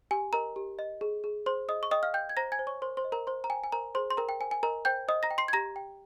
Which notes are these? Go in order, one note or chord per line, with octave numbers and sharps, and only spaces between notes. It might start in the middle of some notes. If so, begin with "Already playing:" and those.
G4 G#5
A#4 D#5 A#5
G4
D#5
G#4
G#4
G#4 C5 C6
G#4 D#5 D#6
C#6
D#5 G5 D#6
F5 F6
G5 G6
G#6
C5 A#5 A#6
G#5 G#6
C5
C#5 C#6
A#4 C5 C6
C5 C6
D#5
A#4 A#5
A#4 C5 C6
A#5
G5 G#5
G#5
A#4 C5 A#5
G#4 C5 C6
C6
A#4 G5 A#5
G5
C5 G#5
G#5
A#4 D#5 A#5
C5 G5 G6
C5 D#5 D#6
A#5 A#6
G5
C6 C7
G#6
G4 A#5 A#6
G5